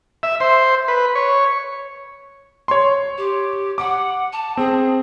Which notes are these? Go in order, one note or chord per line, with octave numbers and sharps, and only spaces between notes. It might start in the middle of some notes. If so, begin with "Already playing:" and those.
E5
C5
B4
C#5
C#5 C6
G4
F#5 D6
A5
C4 G#4